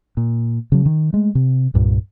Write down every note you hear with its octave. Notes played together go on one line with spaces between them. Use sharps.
A#2
C#3 F#3
D#3
G#3 A3
C3
C2 G2 A#2